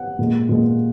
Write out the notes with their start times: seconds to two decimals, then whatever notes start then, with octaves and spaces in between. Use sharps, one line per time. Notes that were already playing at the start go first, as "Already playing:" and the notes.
Already playing: F#5
0.19 A#2 G#3
0.49 A#2 G#3